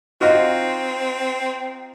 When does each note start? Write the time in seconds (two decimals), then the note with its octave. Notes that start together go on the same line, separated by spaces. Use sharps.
0.21 C4 D#4 F4 F#4